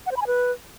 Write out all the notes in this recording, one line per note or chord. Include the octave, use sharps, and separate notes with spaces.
F#5
C5
B5
G#5
B4